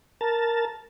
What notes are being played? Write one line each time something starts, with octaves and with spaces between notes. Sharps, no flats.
A#4 A5